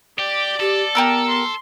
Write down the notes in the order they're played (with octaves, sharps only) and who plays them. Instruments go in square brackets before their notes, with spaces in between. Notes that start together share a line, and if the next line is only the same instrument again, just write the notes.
[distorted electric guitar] G4 [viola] D5
[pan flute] G4 [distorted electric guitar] A4
[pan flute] B3 [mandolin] G4 A#4 E6
[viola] C6